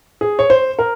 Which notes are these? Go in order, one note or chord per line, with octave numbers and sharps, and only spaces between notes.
G#4
C#5
C5
A#4